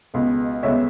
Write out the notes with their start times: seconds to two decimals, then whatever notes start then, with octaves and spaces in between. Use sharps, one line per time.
0.14 C#2 B2 G#3 B3
0.63 C#2 B2 G#3 B3 C#5 E5